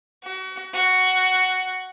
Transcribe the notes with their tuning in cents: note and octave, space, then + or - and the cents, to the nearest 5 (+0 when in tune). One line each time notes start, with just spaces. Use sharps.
F#4 +35
F#4 +5